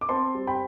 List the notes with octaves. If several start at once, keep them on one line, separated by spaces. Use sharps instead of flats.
D6
C4 A5 C6
G3
G5 B5